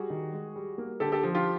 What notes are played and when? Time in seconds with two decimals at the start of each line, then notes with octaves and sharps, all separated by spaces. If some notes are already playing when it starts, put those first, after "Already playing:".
Already playing: G3 F#4 G#4
0.10 D#3
0.33 G#3
0.56 G3
0.78 A#3
1.00 D3 G4 A4
1.12 G4 A4
1.23 F3
1.35 F4 G4